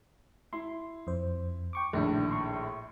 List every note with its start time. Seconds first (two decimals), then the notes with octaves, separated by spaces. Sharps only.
0.53 E4 C6
1.07 F2 C5
1.73 G5 C#6 D6
1.93 A#1 A2 D#3 D4
2.31 C6 C#6